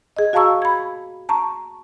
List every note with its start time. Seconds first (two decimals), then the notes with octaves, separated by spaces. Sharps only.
0.17 G#4 D#5
0.33 F#4 F5 A5 A#5 C#6 E6
0.62 B5 G#6
1.29 A5 A#5 C#6